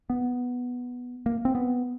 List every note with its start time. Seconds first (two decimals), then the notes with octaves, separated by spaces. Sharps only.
0.10 B3
1.26 A#3
1.45 C4
1.55 B3